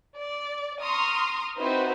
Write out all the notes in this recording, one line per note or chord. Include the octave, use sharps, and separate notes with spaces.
D5
A#5 C6 C#6 D#6 F6
C4 D#4 E4 F#4 B4 C5